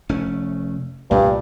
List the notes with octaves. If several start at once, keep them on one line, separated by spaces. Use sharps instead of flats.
F1 A3 C#4
C2 G2 A#2 A3